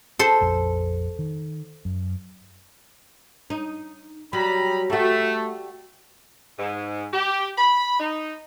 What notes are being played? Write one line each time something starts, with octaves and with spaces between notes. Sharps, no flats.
A4 C5
A#1 F2
D#3
F#2
D#4
F#3 G3 A#5 B5
G3 A3 F#4
G#2
G4
B5
D#4